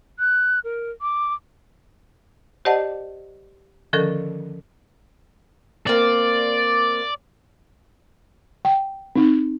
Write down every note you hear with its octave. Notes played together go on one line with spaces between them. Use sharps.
F#6
A#4
D6
G4 C5 D5 D#5 F#5 A5
D3 D#3 F3 C#4 A4 A#4
A#3 C4 D5
G5
C4 D#4